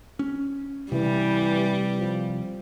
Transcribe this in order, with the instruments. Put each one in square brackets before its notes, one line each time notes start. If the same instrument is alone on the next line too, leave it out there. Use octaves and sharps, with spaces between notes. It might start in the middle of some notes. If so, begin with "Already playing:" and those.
[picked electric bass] C#4
[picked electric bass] C3 [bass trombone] E3 [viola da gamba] G3
[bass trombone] F3